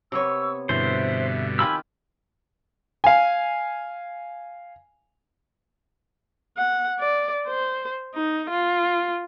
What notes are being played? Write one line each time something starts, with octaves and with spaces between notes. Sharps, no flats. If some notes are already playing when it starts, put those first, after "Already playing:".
C3 B3 C#5 C#6 E6
G2 B2 D3 E3 C5 E5
D#3 F4 G4 G#5 B5 E6
F5 G#5
F#5
D5
C5
D#4
F4